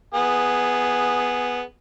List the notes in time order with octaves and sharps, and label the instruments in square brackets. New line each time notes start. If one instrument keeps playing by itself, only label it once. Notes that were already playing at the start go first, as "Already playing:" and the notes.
[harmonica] B3 G#4